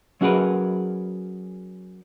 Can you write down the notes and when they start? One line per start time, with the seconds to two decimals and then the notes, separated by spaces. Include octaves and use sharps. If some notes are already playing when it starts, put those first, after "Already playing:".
0.21 F#3 C#4 F#4 G#4 A#4 B4